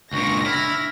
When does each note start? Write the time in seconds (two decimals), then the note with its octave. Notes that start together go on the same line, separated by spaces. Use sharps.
0.13 C#2 A#2 D4 C#6 A#6
0.46 E4 F6